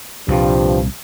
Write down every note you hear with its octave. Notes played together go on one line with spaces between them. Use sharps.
C2 G2 A#2 F3